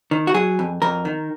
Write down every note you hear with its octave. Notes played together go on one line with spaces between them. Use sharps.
D#3
F#4
F#3 G#4
F2
F2 A#4
D#3